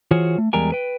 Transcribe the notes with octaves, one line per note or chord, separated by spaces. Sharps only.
E3 F4 F#4 G#4 C5 C#5
A3
E2 G3 G#3 A#4 G5 G#5
B4 G5